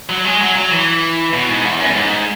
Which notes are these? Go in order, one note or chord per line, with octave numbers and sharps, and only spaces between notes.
F#3
G#3
F#3
F#3
E3
B2
G#2
E2
F#2
F#2
G#2